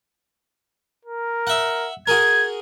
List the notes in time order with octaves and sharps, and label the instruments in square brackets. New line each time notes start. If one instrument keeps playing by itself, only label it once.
[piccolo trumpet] A#4
[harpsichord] E5 F#5
[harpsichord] F#4 G#4 A#4 [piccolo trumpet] G#6